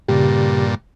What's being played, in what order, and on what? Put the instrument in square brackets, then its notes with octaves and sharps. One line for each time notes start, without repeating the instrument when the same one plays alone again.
[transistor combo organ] G2 A#2 [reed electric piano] C#3 G4